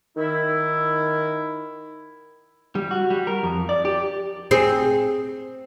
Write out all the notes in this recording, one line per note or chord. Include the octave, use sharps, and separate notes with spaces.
D#3 E4
G3
F#4
G3
A#4
F2
D5
G4
C4 G#4